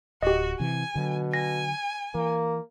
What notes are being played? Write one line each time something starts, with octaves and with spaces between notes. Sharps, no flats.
D1 F#4 G4 D#5
C3 E3 G#5
B2 D3 F#3
G#5 A#6
E3 A#3